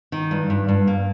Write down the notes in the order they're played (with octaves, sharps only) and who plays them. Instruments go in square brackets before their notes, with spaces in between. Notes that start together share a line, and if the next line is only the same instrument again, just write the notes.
[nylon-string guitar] D#3
G2
G2
G2
A#3